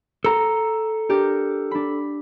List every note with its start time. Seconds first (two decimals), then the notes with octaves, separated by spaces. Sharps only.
0.24 A4 A#5
1.09 D4 G4 A#4
1.71 D4 B5